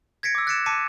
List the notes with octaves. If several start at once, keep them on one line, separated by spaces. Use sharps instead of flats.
G#6 A#6 B6 C#7 D7
D6 E6
F#6 A6 B6 C#7 D7 E7
A5 D6 B6 C#7 D#7